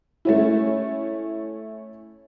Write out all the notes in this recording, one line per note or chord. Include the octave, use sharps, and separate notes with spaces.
A3 C#4 E4